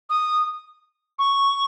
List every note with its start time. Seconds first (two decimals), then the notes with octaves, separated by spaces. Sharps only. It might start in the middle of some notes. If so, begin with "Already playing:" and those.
0.10 D#6
1.19 C#6